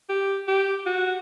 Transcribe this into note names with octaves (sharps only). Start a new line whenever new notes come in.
G4
G4
F#4